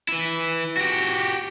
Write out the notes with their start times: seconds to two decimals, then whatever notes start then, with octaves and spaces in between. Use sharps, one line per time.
0.09 E3 E4
0.77 F#4 G4